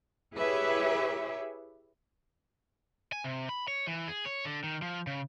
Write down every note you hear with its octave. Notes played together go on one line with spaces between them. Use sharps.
E4 G4 G#4 B4 C#5 E5
G#5
C3
B5
C#5
E3
G#4
C#5
D3
D#3
F3
C#3